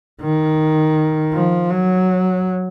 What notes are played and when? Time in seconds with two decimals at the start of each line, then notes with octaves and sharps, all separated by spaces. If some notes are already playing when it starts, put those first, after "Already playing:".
0.21 D#3
1.34 F3
1.71 F#3